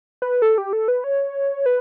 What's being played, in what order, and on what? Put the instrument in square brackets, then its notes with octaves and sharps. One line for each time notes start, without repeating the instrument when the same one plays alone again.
[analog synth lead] B4
A4
G4
A4
B4
C#5
B4